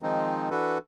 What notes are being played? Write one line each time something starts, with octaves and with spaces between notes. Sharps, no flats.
D#3 F3 G#3 C4 D#4
E3 D4 F#4 A4 B4